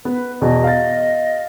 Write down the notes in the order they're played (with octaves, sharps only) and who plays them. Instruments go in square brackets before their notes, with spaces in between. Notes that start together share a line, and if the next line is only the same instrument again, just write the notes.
[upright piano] B3 [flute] B4
[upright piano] E2 B2 [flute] D#5
[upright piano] F5 A6